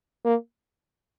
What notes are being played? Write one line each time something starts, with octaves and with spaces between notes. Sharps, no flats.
A#3